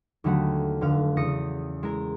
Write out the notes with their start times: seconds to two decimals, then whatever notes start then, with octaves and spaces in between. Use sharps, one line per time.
0.24 D#2 D3 F#3 A3 F#5
0.81 F1 D3 F5
1.17 E2 C#3 D#6 A#6 C#7
1.83 G#3 E4 A#4